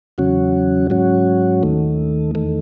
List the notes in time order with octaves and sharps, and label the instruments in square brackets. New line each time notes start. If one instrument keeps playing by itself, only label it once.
[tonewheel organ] E2 C#3 F#3 C#4 F#4
G#2 F#3 C#4 F#4
D#2 D#3 A3
E2 D#3 A3